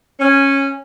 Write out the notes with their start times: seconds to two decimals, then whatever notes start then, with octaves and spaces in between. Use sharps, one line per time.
0.20 C#4